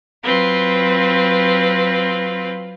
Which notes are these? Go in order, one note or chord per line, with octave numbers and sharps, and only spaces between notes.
F#3 C4 F4 B4